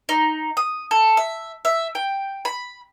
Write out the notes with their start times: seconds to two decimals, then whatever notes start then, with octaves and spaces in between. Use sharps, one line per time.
0.09 D#4
0.57 D#6
0.91 A4
1.17 E5
1.65 E5
1.95 G5
2.45 B5